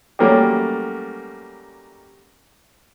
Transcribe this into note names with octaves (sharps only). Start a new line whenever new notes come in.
F#3 G3 A3 A#3 C#4 G4